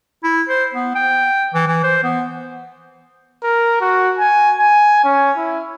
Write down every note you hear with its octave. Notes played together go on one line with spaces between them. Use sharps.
E4
C5
B3
G5
E3
E3
C5
B3
A#4
F#4
G#5
G#5
C#4
E4